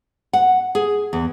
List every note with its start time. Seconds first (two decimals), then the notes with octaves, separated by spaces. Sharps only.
0.33 F#5
0.75 G#4
1.13 E2